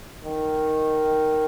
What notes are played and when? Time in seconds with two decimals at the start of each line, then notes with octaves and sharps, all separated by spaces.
0.24 D#3